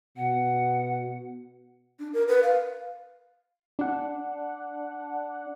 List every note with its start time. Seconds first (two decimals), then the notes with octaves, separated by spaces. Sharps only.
0.17 B2 F#5
1.99 D4
2.13 A#4
2.28 B4
2.43 F5
3.79 D4 F#5